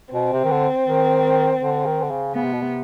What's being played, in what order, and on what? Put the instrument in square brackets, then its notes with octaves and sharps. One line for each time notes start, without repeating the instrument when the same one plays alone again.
[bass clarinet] B2 [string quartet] C4
[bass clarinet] C3
D#3
D3
D#3
D3
D#3
D3
C#3
[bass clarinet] C#3 [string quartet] B3
[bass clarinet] C3
B2
C3